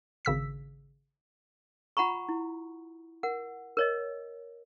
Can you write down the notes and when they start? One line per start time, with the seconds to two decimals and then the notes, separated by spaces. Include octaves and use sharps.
0.25 G#1 C#3 E6 B6
1.97 F4 F#5 A#5 B5 C#6
2.29 E4
3.23 A#4 F#5
3.77 A#4 C#5 D#5